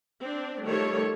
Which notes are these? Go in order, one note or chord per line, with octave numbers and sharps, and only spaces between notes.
C4 D4
D#3 F3 G3 A3 A4 C#5